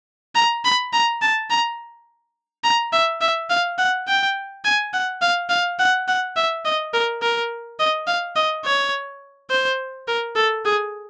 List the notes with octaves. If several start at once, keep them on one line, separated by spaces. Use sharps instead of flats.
A#5
B5
A#5
A5
A#5
A#5
E5
E5
F5
F#5
G5
G#5
F#5
F5
F5
F#5
F#5
E5
D#5
A#4
A#4
D#5
F5
D#5
C#5
C5
A#4
A4
G#4